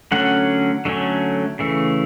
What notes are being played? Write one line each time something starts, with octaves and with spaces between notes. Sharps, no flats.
D3 F#3 A3 C#4 F#5
D3 F#3 A3 C#4
C#3 E3 A3